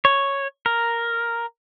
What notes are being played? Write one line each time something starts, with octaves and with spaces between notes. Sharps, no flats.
C#5
A#4